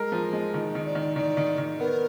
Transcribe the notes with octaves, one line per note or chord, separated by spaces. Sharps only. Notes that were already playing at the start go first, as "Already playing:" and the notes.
Already playing: G#3 A#4
F3
G#3
D#3 F4
D#5
D#3
D5
D#3
D5
D#3 D5
D#3
D#3
B3 A#4